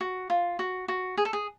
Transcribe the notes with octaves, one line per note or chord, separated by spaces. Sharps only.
F#4
F4
F#4
F#4
G#4
A4
G#4